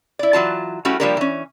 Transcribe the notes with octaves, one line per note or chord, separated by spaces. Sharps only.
E4 D5
E3 F#3 F4 A5
G3 A3 C#4 E4 F#4
F3 G3 A#3 D4 G4 A#4
E3 C#4